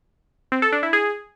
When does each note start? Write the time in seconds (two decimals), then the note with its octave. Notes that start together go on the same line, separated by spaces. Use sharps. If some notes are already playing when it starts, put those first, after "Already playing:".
0.52 C4
0.62 A4
0.72 D4
0.83 E4
0.93 G#4